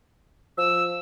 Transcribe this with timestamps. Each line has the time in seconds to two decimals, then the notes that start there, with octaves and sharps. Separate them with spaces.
0.58 F3 E6